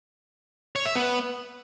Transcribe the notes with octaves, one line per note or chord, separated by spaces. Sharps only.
C#5
E5
B3